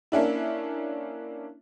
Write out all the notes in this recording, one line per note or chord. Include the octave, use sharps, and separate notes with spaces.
A#3 C#4 D4 E4